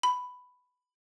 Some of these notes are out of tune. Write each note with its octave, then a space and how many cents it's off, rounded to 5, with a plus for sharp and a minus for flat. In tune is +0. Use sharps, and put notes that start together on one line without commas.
B5 +10